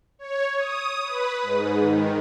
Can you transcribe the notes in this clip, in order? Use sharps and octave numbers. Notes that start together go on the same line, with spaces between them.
C#5
D#6
B4
G#2
D#3